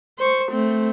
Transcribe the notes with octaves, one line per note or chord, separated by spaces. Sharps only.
C5 C#6
A3 C4